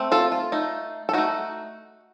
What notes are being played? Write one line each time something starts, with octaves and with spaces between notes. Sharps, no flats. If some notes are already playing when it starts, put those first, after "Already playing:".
Already playing: A3 C4
F4 A4
F4
A3 D#4
A4
A3 D#4 F#4